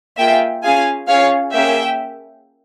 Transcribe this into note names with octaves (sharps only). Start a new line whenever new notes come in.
A#3 F4 G#4 E5 G5
C#4 F4 G#4 F5 G#5
C#4 F4 G#4 C#5 F5
A#3 C#4 F4 G#4 E5 G5